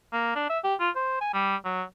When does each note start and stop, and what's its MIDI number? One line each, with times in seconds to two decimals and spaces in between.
0.13 0.33 58
0.36 0.49 62
0.50 0.59 76
0.64 0.75 67
0.80 0.90 65
0.96 1.17 72
1.21 1.32 80
1.34 1.56 55
1.65 1.83 54